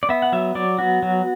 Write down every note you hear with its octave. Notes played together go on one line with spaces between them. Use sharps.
D5
B3 E5
F#5
F#3 E5
F#3 D5
B3 F#4
F#3